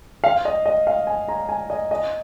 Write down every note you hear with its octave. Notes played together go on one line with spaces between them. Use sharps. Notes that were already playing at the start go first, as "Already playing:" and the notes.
F5
D#5
D#5
F5
G#5
A#5
G#5
D#5
D#5